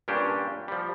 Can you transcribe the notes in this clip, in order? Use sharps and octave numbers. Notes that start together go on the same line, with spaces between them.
G2 A#2 C#4 D4 G4
F3 G3